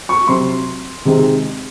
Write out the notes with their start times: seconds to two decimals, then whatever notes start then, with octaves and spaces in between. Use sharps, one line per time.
0.09 C#6
0.28 C3 F#3 C4 C6
1.05 C3 D#3 G#3 C4